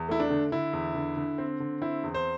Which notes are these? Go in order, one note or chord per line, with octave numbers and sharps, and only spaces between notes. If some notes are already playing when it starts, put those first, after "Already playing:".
Already playing: E2
A3 E4
D4
D3
D3 E4
E2
D3
D3
C4
D3
C4 E4
E2
C5